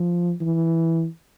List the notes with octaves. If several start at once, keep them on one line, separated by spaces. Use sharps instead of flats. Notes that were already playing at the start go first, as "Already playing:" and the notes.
Already playing: F3
E3